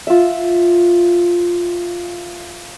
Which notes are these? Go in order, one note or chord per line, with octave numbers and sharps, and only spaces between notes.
F4 E5